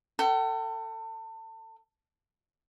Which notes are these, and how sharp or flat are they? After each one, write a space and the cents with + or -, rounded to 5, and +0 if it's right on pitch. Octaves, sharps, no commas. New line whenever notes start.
A4 +30 G5 -45